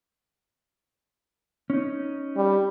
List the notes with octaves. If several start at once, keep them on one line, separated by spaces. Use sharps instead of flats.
C#4 D#4
G3